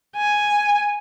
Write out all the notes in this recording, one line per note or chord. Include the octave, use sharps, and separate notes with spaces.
G#5